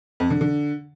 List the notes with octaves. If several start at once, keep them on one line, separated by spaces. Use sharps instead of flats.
F2
D3
D3